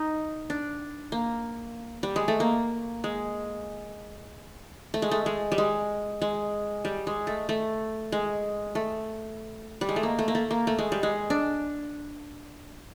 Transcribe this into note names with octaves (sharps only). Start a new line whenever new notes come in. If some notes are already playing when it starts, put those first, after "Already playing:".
Already playing: D#4
D4
A#3
G3
G#3
A3
A#3
G#3
A3
G#3
A3
G#3
G3
G#3
G#3
G3
G#3
A3
A3
G#3
A3
G3
G#3
A3
A#3
A3
A#3
A3
A#3
A3
G#3
G3
G#3
D4